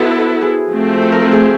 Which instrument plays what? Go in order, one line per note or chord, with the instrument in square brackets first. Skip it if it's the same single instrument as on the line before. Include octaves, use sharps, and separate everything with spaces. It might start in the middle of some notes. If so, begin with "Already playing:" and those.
Already playing: [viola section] B3 E4 A4 [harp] F#4 C5
[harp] G#4
[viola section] F3 A3 C4
[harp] A4
A#4
A4
G#4